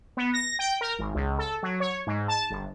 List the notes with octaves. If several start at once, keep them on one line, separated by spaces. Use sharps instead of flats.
B3
A#6
G5
A#4
G#1
C#2
A4
F#3
C#5
G#2
A5
G1